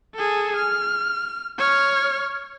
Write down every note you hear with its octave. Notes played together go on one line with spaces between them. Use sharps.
G#4 A4
F6
C#5 F6